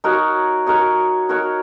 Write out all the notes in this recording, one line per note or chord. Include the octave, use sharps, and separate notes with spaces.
D#4 F#4 A#4 C#5
D#4 F#4 A#4 C#5
D#4 F#4 A#4 C#5